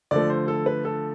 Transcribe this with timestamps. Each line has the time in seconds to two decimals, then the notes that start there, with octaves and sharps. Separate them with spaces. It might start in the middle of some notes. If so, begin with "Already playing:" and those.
0.11 D3 F3 A3 D5
0.30 C5
0.48 A4
0.66 B4
0.85 A4